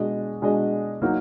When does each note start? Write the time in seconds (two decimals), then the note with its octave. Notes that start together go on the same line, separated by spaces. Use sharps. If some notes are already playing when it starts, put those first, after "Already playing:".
Already playing: B2 G#3 D4 G#4 D#5
0.42 B2 G#3 D4 G#4 D#5
1.02 F#3 A#3 D#4 F#4 A#4